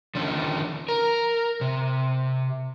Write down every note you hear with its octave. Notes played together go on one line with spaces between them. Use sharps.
D3 D#3 F3 C#4
A#4
C3